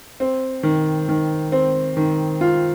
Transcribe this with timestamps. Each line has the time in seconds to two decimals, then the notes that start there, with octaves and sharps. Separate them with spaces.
0.20 C4
0.63 D#3
1.09 D#3
1.52 C4
1.97 D#3
2.41 F4